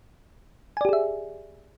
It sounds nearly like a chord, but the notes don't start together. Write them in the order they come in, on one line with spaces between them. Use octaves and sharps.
G#5 D5 G4 G#4 E5